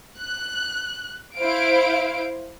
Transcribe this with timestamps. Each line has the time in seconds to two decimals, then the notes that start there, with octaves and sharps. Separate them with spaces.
0.17 F#6
1.36 E4 C5 F5 D7